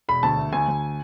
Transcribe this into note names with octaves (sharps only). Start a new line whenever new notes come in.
E1 B5
D2 A5
A3
D2 G#5
D2